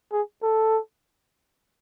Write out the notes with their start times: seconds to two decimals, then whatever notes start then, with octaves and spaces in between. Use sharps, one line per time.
0.12 G#4
0.43 A4